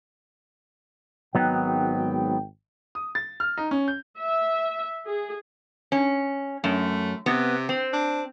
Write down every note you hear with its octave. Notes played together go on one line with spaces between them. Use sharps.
G#1 G#2 F#3 B3 D#4 G5
D#6
A6
F6
D#4
C#4
G6
E5
G#4
C#4
F#2 A3
C3 B3
C4
D4